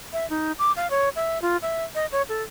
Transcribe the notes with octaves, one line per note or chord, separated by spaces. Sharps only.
E5
D#4
D6
F5
C#5
E5
F4
E5
D#5
C#5
A4